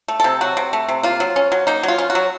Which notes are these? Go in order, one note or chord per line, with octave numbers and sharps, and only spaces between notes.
A3
C3 A4
F#3 F#4
C3
A3
C3
A#3 F4
F#3
C#4
F#3
A#3 D#4
F#3 F4
C#4
F#4
F#3